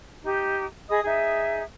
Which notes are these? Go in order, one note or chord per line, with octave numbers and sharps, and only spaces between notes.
D#4 G4
G#4 D#5 B5 D#6
D#4 G#4 E5